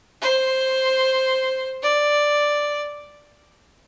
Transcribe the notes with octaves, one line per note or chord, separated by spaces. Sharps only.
C5
D5